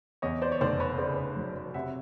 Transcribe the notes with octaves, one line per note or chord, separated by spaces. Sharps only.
E2 C#5 D#5
C5 D5
C#5
F1 C5 D5
B4 C#5
C#3 C5 D5
F#3
C3 E5 F#5